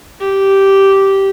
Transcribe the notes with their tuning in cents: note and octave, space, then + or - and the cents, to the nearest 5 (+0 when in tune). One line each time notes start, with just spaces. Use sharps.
G4 -10